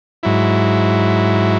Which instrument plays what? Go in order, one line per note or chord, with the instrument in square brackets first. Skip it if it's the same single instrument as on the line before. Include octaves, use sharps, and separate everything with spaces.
[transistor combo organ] G#2 F#3 E4